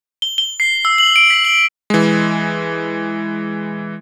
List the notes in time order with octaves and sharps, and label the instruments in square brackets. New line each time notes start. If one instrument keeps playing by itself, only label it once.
[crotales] G7
G7
C7
E6
F#7
D7
B6
F#7
[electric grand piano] E3 G#3